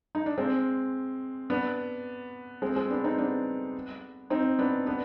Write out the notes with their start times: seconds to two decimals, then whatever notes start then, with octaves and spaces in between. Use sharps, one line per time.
0.15 D#4
0.26 D4
0.38 G#3 C4
1.50 B3 D4
2.62 G#3 C4
2.76 G#3 C4
2.90 B3 D4
3.04 C4 D#4
3.18 B3 D4
4.30 C4 D#4
4.59 B3 D4
4.87 B3 D4